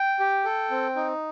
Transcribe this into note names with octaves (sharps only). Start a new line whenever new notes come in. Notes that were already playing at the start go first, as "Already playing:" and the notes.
Already playing: G5
G4
A4
C4
D#4